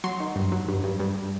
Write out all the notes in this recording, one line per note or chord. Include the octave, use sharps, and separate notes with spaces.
F#3 C6
D#3
G2
F#3
G2
G2
G2